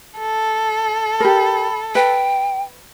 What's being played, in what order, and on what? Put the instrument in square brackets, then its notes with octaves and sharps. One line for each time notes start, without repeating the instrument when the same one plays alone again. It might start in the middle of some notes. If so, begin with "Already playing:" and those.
[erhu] A4
[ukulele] G4 A#4 [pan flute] B5
[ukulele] B4 [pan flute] G5